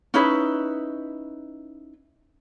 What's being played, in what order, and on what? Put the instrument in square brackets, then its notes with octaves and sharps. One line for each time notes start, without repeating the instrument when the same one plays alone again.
[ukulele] C#4 D#4 E4 B4